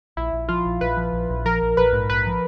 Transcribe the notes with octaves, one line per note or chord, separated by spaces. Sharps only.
A#1 E4
A#1
F3 F4
A#1
A#1 B4
F3
A#1
A#1
F3 A#4
A#1
A#1 B4
G#2
A#1 B4
F3